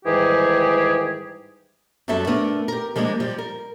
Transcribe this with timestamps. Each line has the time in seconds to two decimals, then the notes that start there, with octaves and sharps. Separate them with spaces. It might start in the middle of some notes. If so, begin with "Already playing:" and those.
0.05 G#2 D#3 E3 G3 G4 G#4
2.08 F#2 F#3 G3 A4 E5 A5
2.27 A3 B3 D4 A#4
2.68 G4 A#4
2.96 F3 G3 G#3 A#3 D4
3.20 F3 G3
3.38 A#4